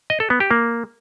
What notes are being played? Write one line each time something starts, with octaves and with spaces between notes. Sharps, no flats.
D#5
A4
B3
G4
A#3